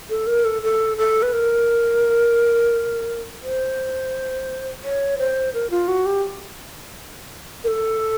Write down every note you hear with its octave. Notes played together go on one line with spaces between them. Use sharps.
A4
A#4
A4
A4
A4
B4
A#4
C5
C#5
C5
A#4
F4
F#4
G4
A#4
A4